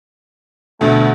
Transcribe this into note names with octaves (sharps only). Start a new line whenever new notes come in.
D2 B2 D3 A3